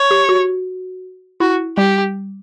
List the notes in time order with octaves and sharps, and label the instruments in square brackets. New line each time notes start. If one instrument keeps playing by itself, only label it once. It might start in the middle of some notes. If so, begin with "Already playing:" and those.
Already playing: [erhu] C#5
[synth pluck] G4
F#4
[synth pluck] E4 [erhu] F#4
[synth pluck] G3 [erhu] G4